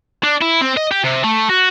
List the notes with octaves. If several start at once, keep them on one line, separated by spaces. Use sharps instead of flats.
D4
E4
C4
D#5
G4
C3
A3
F#4